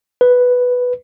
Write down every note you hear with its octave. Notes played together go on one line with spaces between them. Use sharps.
B4